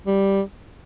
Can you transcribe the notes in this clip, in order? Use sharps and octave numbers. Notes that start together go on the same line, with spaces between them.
G3